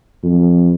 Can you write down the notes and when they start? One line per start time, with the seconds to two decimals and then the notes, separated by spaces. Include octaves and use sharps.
0.23 F2